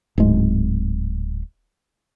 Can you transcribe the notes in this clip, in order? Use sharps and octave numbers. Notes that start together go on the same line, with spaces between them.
D1 G#2 G#3